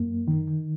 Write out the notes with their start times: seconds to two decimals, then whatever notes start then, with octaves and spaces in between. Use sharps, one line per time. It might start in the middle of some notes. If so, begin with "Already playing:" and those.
Already playing: F#2 A#3
0.28 D#3